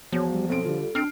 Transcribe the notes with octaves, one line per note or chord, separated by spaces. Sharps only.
E2 F3 F#4 C#5
G3
B1 C4 A4 D7
D3 G3 F4
C4 D4 F6 C7 D7